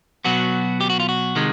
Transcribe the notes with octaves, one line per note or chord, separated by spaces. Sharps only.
B2 F#3 B3 F#4
G4
F#4
F4
F#4
C3 D#3 G#3